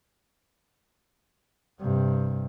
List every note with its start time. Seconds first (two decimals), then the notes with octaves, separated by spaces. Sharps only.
1.81 G2 C3